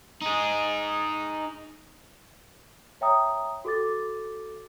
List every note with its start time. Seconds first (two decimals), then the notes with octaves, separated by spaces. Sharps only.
0.21 D#4 G#4
3.01 C#5 E5 G5 A#5 D#6
3.65 F#4 A4 D6 A6